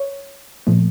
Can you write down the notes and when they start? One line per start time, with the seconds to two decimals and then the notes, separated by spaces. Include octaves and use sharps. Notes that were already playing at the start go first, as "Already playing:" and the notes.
Already playing: C#5
0.67 A#2 F3 A3